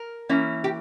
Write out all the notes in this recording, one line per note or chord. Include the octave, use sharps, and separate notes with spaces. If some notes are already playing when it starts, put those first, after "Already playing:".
Already playing: A#4
E3 A#3 C#4 E4
G4